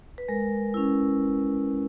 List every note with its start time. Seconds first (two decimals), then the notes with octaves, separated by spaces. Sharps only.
0.18 B4
0.28 G#3 A#4
0.74 C#4 E4